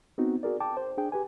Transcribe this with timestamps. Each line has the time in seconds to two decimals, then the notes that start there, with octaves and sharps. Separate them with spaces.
0.18 B3 C4 D#4 F#4
0.43 F#4 G#4 A#4 D5
0.60 G5 A5 D6
0.77 C5
0.98 D4 G#4 G5
1.12 G4 B4 G#5